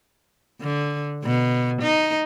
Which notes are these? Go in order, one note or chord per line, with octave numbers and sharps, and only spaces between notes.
D3
B2
D#4